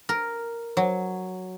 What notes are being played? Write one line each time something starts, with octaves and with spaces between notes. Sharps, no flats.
A#4
F#3